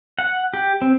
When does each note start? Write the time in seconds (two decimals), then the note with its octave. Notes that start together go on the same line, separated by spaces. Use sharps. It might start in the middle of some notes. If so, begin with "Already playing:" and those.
0.19 F#5
0.54 G4
0.82 C4